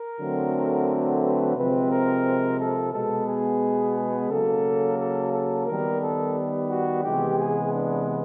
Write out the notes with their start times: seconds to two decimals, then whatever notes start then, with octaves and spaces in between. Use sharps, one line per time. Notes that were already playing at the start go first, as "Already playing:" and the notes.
Already playing: A#4
0.19 D3 F#3 A3 C4
1.22 B4
1.56 C3 F3 G#3 C4 B4
1.90 A#4
2.59 A4
2.93 B2 G#3 B3 A4
3.28 G#4
3.96 G#4
4.30 C#3 F#3 A#3 A4
4.99 A4
5.33 A4
5.67 D#3 G3 B3 A#4
6.02 A4
6.71 F#4
7.04 C3 E3 G#3 B3 G4
7.39 G#4
7.73 D4